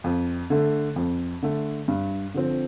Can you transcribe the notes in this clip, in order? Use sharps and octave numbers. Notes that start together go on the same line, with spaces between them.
F2
D3 A3
F2
D3 A3
G2
D3 F3 C4